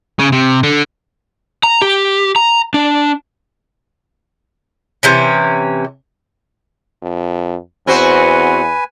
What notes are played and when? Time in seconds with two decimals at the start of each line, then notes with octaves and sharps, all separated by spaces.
0.19 C#3
0.32 C3
0.63 D3
1.63 A#5
1.82 G4
2.36 A#5
2.74 D4
5.03 C3 E3 C#4
7.02 F2
7.87 E2 C4 F#4 B4 C5 G#5